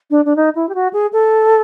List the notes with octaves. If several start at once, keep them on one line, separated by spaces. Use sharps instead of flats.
D4
D4
D#4
E4
G4
F#4
G#4
A4